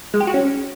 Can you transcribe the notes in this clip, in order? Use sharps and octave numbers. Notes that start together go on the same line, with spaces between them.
G#3
G4
F#4
C#4